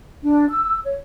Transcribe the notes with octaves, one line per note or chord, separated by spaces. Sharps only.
D4
E6
C#5